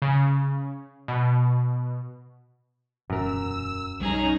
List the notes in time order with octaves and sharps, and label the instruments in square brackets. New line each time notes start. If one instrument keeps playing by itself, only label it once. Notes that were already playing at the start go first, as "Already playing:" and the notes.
[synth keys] C#3
B2
[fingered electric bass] E1 A#2 [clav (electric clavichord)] F#2 A#4 [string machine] E6
[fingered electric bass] B1 G3 [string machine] C#4 D#4 [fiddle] G#4 A#5